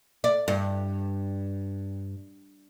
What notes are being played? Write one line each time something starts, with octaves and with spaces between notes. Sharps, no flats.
D5
G2